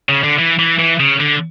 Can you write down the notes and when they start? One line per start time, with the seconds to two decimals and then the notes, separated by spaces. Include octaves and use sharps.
0.09 C#3
0.24 D3
0.39 E3
0.59 E3
0.79 E3
1.00 C#3
1.20 D3